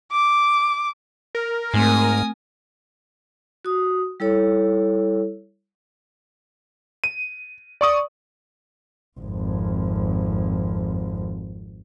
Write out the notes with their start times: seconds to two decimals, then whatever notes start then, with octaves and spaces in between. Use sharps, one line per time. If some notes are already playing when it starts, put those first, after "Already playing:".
0.11 D6
1.35 A#4
1.74 G#2 A3 C4 G#5 D#6
3.65 F#4 D#6
4.20 G3 E4 A4 C#5
7.04 D#7
7.81 D5 C#6 D#6
9.19 G#1 F2